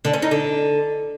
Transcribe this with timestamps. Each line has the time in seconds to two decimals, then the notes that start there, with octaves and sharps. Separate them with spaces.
0.05 D3
0.14 C#4
0.22 D#4
0.31 D3